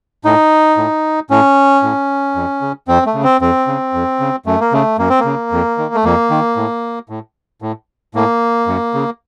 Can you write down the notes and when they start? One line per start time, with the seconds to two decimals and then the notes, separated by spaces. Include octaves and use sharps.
0.25 A2 D#4
0.77 A2
1.30 A2 C#4
1.83 A2
2.36 F2
2.62 C#3
2.88 F2 C4
3.06 A3
3.15 C#3
3.24 C4
3.41 F2 C4
3.67 C#3
3.94 F2
4.20 C#3
4.46 F#2 A3
4.60 A#3
4.73 C#3 A3
4.99 F#2 A#3
5.10 C4
5.20 A#3
5.25 C#3
5.52 F2
5.78 D#3
5.95 A3
6.04 F2 A#3
6.30 D#3
6.57 A2
7.09 A2
7.62 A2
8.15 A2 A#3
8.67 F#2
8.94 C#3